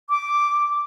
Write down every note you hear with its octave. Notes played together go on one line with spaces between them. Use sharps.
D6